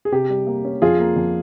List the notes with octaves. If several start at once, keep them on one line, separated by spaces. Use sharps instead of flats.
G#4
C3 G4
G3
A#3
C#4
F2 F4 G#4
A#3
F2